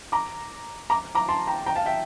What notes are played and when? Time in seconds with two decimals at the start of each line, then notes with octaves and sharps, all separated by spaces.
0.12 A#5 D6
0.90 A#5 D6
1.15 A#5 D6
1.28 A5 C6
1.47 G5 A#5
1.66 G5 A#5
1.76 F5 A5
1.86 E5 G5